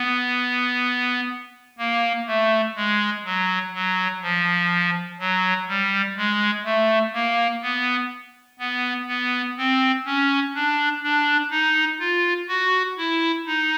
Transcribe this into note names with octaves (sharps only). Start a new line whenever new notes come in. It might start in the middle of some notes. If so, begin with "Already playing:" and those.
Already playing: B3
A#3
A3
G#3
F#3
F#3
F3
F#3
G3
G#3
A3
A#3
B3
B3
B3
C4
C#4
D4
D4
D#4
F4
F#4
E4
D#4